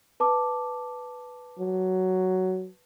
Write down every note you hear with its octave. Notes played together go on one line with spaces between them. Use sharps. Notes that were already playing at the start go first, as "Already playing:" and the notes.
B4 A5 D6
F#3